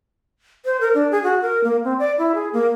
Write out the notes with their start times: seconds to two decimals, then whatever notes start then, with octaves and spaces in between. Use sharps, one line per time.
0.65 C5
0.81 A#4
0.94 D4
1.11 G#4
1.23 F#4
1.42 A#4
1.64 A#3
1.84 C4
1.99 D5
2.18 E4
2.35 G#4
2.53 A#3